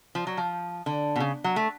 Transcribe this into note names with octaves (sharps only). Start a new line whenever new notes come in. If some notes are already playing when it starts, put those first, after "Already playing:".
F3
F#3
F3
D3
B2
C#3
F#3
A3